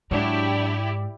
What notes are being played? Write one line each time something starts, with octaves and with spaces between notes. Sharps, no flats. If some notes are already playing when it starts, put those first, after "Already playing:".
G#2 F#3 D4 E4 G4 D5